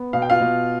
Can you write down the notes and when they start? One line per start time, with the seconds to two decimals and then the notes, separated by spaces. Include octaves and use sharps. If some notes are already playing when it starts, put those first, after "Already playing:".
Already playing: B3
0.13 B2 F5
0.22 G5
0.30 F4 F5
0.40 B2